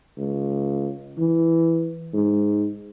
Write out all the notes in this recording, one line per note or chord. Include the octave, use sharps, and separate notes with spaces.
C#2
E3
G#2